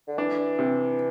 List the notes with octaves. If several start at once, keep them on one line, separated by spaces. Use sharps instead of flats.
D3
E3 D4
C3